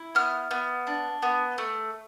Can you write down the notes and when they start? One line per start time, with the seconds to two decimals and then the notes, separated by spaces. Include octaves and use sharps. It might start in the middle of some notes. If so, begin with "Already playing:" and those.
Already playing: E4
0.15 B3 F6
0.51 B3
0.87 D4
1.23 B3
1.58 A3